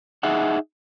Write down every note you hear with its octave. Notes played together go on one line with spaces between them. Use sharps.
D#4 G#4 E5 F#5